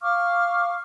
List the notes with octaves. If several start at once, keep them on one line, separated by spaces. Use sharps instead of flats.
F5 C#6 D6 F6